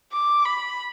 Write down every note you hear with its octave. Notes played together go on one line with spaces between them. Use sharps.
D6
B5